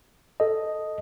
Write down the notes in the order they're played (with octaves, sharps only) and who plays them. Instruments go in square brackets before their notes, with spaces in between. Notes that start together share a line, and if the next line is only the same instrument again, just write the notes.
[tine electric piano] A4 D#5